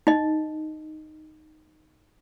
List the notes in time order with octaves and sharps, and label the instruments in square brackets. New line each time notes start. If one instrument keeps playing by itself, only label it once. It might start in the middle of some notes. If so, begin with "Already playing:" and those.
[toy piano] D#4 D#5